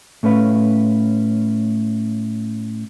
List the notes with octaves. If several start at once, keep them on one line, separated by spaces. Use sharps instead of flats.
A2 A3 C#4 B4 F5